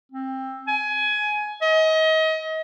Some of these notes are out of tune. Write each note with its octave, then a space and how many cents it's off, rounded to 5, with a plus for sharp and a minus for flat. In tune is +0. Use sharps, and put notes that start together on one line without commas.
C4 +20
G#5 +20
D#5 +30